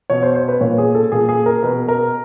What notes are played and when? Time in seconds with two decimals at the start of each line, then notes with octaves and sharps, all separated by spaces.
0.10 B2 C#5
0.23 C5
0.35 C5
0.48 B4
0.61 A#2 C#5
0.78 G#4
0.95 A4
1.12 A#2 G#4
1.29 G#4
1.46 A#4
1.63 B2 B4
1.88 A#4